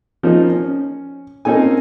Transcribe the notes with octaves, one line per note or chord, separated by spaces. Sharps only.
F3 A#3 C#4 D#4 F4
C#4
A#3 C4 C#4 D#4 A4 G#5